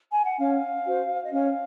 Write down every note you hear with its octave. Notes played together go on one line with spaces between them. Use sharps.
G#5
F#5
C#4 F5
F#4 C5
D#5
C#4 F5